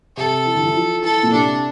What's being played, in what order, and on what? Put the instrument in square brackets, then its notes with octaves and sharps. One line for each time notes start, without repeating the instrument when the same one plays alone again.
[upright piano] C3 [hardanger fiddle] A4
[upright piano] E3
D3
E3
F3
[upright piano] E3 [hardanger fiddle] A4
[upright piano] A#2
[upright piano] C3 [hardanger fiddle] D4